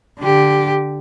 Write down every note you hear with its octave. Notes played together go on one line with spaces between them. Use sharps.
D3 G4